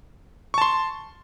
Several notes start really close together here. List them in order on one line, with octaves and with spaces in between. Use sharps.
C#6 A5 C6